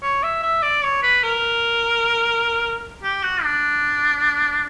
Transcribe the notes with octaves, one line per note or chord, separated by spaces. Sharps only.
C#5
E5
E5
D5
C#5
B4
A#4
G4
F#4
D4